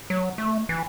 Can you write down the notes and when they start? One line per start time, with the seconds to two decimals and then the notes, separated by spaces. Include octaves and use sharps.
0.10 F#3
0.38 A3
0.69 E3